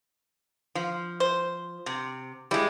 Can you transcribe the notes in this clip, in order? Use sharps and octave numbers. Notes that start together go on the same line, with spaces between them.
F3
C5
C3
G3 G#3 E4